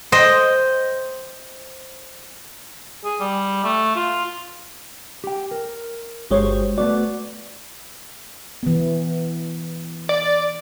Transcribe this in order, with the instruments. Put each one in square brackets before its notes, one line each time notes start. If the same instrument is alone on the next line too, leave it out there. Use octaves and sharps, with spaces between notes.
[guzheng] C5 D#5 G5
[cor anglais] G#4
G3
A3
F4
[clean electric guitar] G4 G5
A#4
[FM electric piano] G1 G#3 C#5 [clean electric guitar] F#4 G4 C5
[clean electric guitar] A3 B3 F#4 [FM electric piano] D5
[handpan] E3 B3
[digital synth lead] D5